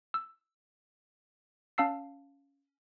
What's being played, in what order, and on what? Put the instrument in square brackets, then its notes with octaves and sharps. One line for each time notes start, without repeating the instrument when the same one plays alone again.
[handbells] E6
C#4 F5 A5 E6 C7